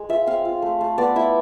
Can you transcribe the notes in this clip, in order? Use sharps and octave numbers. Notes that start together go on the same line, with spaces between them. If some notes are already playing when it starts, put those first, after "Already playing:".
Already playing: G#3
F4 E5
C4 F5
F4
A3
A3
B3 D5
E4 E5